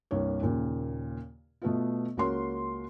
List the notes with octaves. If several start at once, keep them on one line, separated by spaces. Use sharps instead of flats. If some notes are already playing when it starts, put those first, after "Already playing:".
C2 G2 A#3 C#5
D#2 A#2 C#3
B2 A3 B3 F4
C#2 A#3 F#4 A#4 C#5 C6